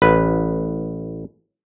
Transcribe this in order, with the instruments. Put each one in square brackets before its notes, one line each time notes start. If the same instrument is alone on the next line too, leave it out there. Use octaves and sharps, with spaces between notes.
[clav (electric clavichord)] A1 B4